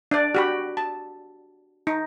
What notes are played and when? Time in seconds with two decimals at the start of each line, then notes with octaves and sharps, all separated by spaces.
0.11 D4 D5
0.35 F#4 G4 B5
0.77 A5
1.87 D#4